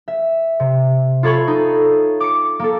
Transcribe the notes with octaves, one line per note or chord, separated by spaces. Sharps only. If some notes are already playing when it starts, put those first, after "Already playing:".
E5
C3
F4 A4 C#5 B5 C#6
D#4
D6 C#7
A#3 A4